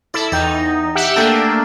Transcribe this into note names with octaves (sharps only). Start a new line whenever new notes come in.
E4 A4 D5
E2 D#4 D5 G5
G4 E5 F#5
A3 A#3 D4 A4 G5 A5